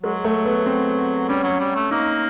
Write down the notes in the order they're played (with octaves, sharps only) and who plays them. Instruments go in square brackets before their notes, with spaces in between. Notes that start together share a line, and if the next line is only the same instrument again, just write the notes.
[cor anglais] F#3 [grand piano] G#3
[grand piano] A3
B3
C4
[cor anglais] G3 [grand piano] C#4
[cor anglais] F#3
G3
A3
[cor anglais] A#3 [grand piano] D#4